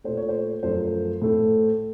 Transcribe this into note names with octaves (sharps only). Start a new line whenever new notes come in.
A#2 A3 C5
C#5
C5
F#2 F3 A3 C5
A2 A3